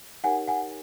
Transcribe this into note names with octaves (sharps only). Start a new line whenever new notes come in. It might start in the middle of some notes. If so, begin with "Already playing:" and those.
D#4 G4 A#4 C#5 F#5 G#5
F#5 G#5